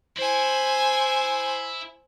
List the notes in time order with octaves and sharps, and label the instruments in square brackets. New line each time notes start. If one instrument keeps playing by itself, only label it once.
[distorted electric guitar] E4 [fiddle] C5 G#5